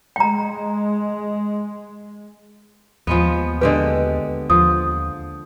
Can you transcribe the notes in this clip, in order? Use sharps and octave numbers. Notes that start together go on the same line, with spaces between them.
G#3 G5 A#5
D#2 F3 G#3 B3
D3 G#3 G4 B4 D#5
D#2 F3 D#6